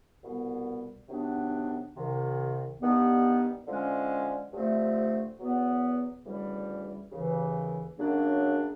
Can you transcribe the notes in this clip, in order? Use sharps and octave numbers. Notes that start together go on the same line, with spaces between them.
C2 B2 G3 B3
C3 D#3 F#3 B3 D4
C2 C3 D#3
G2 D#3 G3 B3
D3 F3 G#3 C#4
G2 D3 F3 A3 C4
E2 B2 F#3 B3
D2 C#3 E3 G3
D#2 C#3 E3
F#2 C#3 F#3 A#3 D4